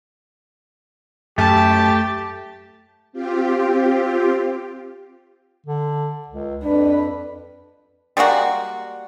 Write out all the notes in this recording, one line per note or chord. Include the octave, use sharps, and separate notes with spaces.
F#2 A3 G4 A5
C4 F4 G4
D3
C#2
F2 D4 B4
G3 G#3 A#3 F#4